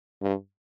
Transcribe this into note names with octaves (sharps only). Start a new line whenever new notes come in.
G2